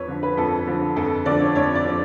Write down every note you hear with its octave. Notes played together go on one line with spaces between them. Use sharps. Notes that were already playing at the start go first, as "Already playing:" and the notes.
Already playing: F2 B4 C#5
D3 F3
B4
F2 A4
D3 F3
F2 A4
D3 F3 D5
C#5
F2 C#5
D5
D3 F3